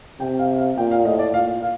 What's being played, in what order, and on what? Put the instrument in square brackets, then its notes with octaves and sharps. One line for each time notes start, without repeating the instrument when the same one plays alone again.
[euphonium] C3 [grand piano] G5
[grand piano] F5
F5
[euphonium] A#2 [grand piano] G5
[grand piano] F5
[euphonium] A2 [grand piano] D#5
[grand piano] D5
[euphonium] A#2 [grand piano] F5
[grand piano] F5